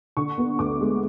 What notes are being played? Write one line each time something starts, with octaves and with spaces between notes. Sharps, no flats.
D3 C#6
B3
D2 D6
G#3